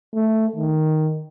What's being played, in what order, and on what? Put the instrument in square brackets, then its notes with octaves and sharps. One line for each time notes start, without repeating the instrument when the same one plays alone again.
[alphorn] A3
D#3